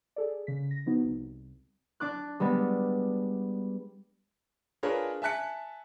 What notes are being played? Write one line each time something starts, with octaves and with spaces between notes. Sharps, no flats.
G#4 A4 D5
C#3 B6
A#6
F3 B3 D#4 F#4
C2
D4 D6 F#6
G3 G#3 B3
D4 F4 G#4 A#4 B4 C#5
E5 G#5 A5 F#6 B6 C#7